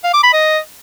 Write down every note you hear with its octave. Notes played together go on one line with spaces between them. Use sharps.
F5
D6
B5
D#5